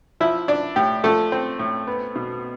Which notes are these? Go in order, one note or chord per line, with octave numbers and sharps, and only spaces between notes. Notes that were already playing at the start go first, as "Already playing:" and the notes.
F3 E4 E5
D4 D5
A2 G4
F3 A3 A4
C4
A2
B3
B2